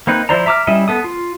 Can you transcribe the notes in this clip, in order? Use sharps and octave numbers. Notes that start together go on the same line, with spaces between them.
A#3 C4 D#4 B4
F3 E4 C5 D5 A#5
E5 A#5 D6 E6 F6
G3 C#4 E4 D#5 E5
B3 A4 D#6
F4